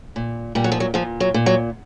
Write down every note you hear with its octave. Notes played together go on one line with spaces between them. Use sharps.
A#2
A#2 G3
F#3
F3
F#3
A#2 F3
F#3
A#2
F#3